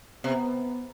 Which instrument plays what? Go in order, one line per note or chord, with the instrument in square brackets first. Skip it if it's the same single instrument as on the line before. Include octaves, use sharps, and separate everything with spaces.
[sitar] C3 [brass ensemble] B3